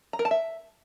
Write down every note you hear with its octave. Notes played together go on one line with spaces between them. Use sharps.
A#5
A#4
A5
E5